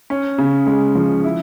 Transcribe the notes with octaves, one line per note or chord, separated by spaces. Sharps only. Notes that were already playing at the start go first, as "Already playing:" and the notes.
C#4
C#3
G#3
F3
E4